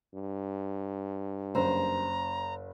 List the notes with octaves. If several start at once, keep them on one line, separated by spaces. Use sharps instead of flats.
G2
F#1 C5 A#5